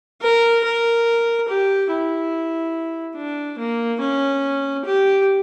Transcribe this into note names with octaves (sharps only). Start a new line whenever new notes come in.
A#4
A#4
G4
E4
D4
A#3
C#4
G4